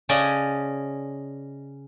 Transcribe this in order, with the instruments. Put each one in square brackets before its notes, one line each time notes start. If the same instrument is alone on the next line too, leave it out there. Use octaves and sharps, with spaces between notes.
[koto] C#3 C#4 D5 D#5 G#5 A5